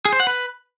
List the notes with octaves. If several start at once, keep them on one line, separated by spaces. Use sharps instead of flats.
G#4
C5
F#5
B4